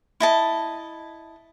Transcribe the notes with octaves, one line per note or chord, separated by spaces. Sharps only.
E4 D#5 A5